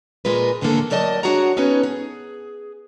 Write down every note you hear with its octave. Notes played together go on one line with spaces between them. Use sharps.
A#2 G#3 F4 A#4 B4
A2 D3 E3 A#3 A4
A2 F#3 A#4 D5 D#5 A5
D4 F#4 G#4 C#5 F#5 A#5
B3 C#4 D#4 A4 B4 C#5
G#4